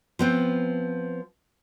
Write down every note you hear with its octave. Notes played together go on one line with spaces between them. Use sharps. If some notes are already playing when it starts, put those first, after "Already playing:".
F3 B3 C4